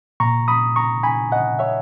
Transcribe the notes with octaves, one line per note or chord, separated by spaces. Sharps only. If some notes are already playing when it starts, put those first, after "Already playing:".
A#2 A#5 C#6
B5 D#6
A#5 C#6
G#5 B5
D#5 F#5
C#5 E5